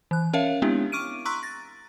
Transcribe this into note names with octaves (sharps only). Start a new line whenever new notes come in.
E3 F#6
C#4 A#4 C#5 E5 F5
G#3 B3 C4 D4 E4 G4
C#6 D6 F6 D7 D#7
A#5 C6 C#6 E6 F#6 B6
A6 A#6